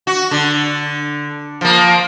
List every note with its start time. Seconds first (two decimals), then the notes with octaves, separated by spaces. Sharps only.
0.07 F#4
0.31 D3
1.61 F3 A#3